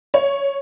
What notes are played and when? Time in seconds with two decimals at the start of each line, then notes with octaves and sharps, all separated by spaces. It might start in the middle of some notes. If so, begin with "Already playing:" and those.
0.14 C#5